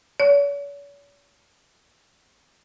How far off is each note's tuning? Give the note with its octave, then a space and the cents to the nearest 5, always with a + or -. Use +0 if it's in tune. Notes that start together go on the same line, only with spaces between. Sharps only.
C#5 +45